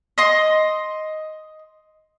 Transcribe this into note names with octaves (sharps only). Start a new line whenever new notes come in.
D#5 C6